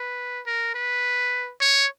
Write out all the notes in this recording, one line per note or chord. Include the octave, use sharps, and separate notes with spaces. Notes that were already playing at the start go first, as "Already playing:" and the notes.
Already playing: B4
A#4
B4
C#5